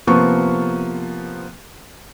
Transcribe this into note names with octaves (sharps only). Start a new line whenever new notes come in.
C3 F3 A#3 B3 C#6